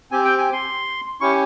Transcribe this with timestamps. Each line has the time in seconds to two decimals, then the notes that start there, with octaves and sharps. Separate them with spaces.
0.11 C4 G4 G#5
0.25 G5
0.38 G#5
0.53 C6
1.21 C#4 E4 G4 C#6